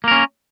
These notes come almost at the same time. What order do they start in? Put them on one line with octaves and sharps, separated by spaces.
A#3 A#4 C#4